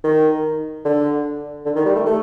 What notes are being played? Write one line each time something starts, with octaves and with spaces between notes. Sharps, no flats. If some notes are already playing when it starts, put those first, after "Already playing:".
D#3
D3
D3
D#3
G3
A3
A3